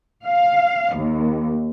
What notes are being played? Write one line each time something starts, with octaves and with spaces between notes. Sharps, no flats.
F5
D#2